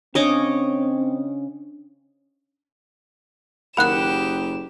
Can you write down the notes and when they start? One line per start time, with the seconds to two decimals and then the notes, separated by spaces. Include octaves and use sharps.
0.15 C#3 C4 D4 C#5 D#5 D6
3.77 F#1 D#3 G4 F#5 B5 F#6 E7